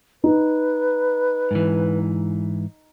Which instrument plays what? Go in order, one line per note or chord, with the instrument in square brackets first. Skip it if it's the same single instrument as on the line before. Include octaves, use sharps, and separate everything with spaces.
[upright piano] D#4 [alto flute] B4
[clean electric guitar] G#2 E3